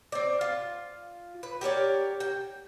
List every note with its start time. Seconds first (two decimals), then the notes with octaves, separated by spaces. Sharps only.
0.12 C4 D5
0.41 F4
1.43 B4
1.61 G4 A#4 C#5 D5
2.20 G5